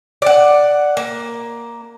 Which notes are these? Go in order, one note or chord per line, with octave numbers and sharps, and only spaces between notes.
D5 F#5
A#3